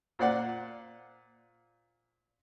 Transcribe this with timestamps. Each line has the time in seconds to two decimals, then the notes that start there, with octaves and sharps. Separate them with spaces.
0.19 A#2 C5 D5 F#5 F#6